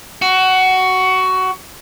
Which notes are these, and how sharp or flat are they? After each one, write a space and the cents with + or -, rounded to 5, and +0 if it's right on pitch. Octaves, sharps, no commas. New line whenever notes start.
F#4 +15